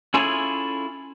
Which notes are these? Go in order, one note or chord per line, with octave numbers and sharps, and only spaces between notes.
C#4 E4 F4 G#4 A4 C#5